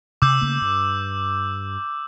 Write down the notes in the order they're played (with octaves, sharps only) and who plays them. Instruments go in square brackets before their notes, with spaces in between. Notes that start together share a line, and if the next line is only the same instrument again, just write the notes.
[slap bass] C3 [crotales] D6 E6 G6
[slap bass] C#3 A3 A#3
G2